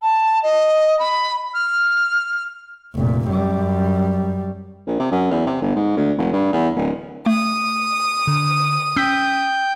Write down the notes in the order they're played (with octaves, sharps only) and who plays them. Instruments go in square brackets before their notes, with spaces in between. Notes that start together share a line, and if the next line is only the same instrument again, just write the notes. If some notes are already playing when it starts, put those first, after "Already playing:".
[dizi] A5
D#5
B5
F6
[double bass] F1 A#2
F#2 G3
[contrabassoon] A#1
C3
F#2
E2
C3
G1
G#2
D2
F1
G2
E2
D1
[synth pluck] A3 [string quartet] D#6
[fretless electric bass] D3
[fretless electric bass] C#4 [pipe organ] G5 G6 [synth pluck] E6 B6